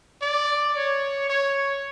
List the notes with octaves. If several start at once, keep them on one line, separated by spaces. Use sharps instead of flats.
D5
C#5
C#5